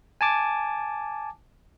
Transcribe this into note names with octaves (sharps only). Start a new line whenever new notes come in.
G#5 A5 D6